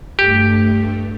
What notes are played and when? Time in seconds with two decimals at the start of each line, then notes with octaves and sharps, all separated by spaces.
0.19 G2 A3 G4